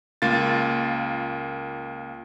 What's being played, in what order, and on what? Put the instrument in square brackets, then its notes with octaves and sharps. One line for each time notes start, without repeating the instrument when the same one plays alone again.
[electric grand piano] C#2 A#3 F4 A6